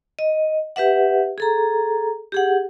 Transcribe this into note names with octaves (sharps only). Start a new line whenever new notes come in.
D#5
G4 B4 E5 F#5
G#4 A4 A#5
G4 G#4 F#5